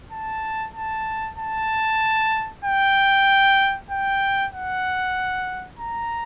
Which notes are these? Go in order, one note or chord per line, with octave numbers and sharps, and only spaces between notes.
A5
A5
A5
G5
G5
F#5
A#5